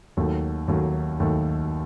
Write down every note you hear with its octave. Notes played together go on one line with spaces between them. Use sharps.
D#2 D#3 F#3 A3
D#2 D#3 F#3 A3
D#2 D#3 F#3 A3